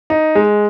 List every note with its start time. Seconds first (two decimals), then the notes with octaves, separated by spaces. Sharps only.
0.10 D#4
0.35 G#3